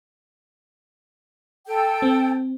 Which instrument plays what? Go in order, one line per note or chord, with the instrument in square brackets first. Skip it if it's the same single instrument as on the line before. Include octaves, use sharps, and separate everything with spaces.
[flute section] A4 G5
[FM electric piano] C4